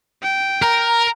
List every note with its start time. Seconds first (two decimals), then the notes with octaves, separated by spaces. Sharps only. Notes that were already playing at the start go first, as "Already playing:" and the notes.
0.22 G5
0.62 A#4 A#5